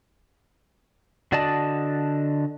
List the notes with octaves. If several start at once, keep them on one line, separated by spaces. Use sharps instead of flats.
D3 F#4 D5 D#5 A5